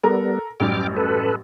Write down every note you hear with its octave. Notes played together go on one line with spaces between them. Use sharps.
G3 B3 A4 A#4
A1 F#2 G3 G5 D6 F6
A4 B4